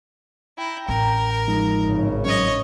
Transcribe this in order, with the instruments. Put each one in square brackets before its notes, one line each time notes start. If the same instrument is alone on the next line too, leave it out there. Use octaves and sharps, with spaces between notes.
[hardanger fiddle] E4 [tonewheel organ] G5 A#5
[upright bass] A1 [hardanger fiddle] A#4
[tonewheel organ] F3 G#3 D#4
[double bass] G#1 C#3
[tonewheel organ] F#3 C#4 [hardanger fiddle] C#5 D#5